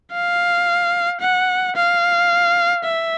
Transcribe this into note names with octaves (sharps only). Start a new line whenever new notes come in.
F5
F#5
F5
E5